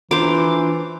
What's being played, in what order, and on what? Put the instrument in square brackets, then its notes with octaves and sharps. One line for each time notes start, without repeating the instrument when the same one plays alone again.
[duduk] E3 [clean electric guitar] D4 F4 A#5 [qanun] C5 D6